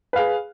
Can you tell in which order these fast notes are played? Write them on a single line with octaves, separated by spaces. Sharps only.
B4 F5 G#4